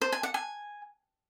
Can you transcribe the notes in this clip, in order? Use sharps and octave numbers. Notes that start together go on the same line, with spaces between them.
C5
G#5
F#5
G#5